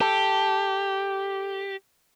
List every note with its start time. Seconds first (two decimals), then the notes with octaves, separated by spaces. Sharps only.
0.01 G4 A4